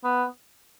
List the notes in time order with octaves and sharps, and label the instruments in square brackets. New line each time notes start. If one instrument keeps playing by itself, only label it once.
[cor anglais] B3